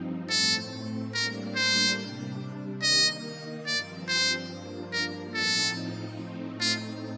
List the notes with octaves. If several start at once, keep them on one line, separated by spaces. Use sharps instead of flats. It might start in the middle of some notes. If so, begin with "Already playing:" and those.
Already playing: G2 F3 C4 D#4
A2 A3 C4 A4
A2 G3 A#3 D4 A#4
C5
C3 G3 D4
D#3 A#3 D#4 D#5
G2 F3 C4 D5
C5
G2 F3 A#3 D4
A#4
A2 F3 C4 D#4 A4
A2 A3 C4 D#4
F4